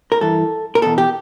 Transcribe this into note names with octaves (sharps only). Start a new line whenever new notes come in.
A#4
G2 E3 A4
A#4
E2 B2 A4
G4